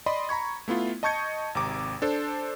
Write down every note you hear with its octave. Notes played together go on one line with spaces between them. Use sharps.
D5 D#5 B5 C6
A#5 B5 C#6 G#6
A3 B3 E4 F4
D#5 A5 C#6 G6 G#6 C#7
G#1 C3 A#5 D6
D4 A4 C5